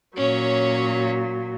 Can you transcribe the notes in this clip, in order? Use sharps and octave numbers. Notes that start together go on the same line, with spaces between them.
A#2 F#3 C#4 C#5